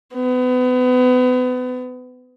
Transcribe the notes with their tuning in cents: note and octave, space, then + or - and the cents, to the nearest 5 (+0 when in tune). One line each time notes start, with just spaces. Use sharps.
B3 +30